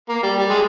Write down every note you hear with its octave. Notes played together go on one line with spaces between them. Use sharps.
A#3
G3
G3
G#3